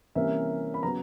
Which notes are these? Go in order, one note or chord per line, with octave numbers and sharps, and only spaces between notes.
C3 E3 G3 A#3 C#4 E5
B5
C#3 F#3 B3 A#5